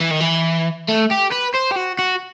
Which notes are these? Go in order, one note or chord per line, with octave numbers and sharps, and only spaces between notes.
E3
D#3
E3
A3
G4
B4
C5
G4
F#4
F#4